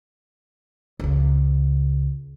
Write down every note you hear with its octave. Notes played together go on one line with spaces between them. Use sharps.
C#2 C#3